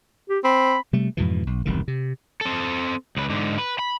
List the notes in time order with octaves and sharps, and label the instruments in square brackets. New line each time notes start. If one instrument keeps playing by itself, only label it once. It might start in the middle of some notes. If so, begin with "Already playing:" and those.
[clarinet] G4
[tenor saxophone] C4 [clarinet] B5
[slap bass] C3 G3 A3
F2 G#2 B2 E3
B1
E1 C2 G2 D#3
C3
[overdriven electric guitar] C4 A4
C#2 B4
G#2 D3
B4
B5